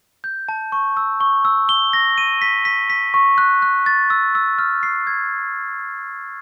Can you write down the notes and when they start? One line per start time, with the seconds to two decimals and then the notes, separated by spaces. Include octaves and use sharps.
0.24 G6
0.49 A5
0.72 C#6
0.97 E6
1.21 C#6
1.45 E6
1.69 G7
1.93 A#6
2.18 D#7
2.42 B6
2.65 B6
2.90 B6
3.14 C#6
3.38 F#6
3.62 F#6
3.86 A6
4.10 E6
4.35 E6
4.59 F6
4.83 C7
5.07 G#6